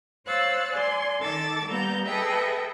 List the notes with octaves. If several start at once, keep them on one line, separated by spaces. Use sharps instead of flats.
C5 C#5 F5 E6 F#6 A6
D5 G#5 C6
D#3 A4 D6 E6 A6
G3 A#3 B3 A#5 G6
G#4 A4 B4 D#5 E5 G5